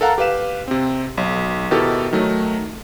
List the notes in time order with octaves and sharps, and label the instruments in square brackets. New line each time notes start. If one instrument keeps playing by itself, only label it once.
[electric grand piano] A4 A#4 F5 F#5 A5 A#5
G4 B4 F5 E7
C3 C4
B1
B2 D#3 E4 G4 A4
D#3 F#3 A3